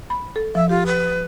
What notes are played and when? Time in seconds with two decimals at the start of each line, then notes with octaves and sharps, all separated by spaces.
0.10 B5
0.36 A4
0.55 F3 E5
0.69 F4 G4
0.86 B4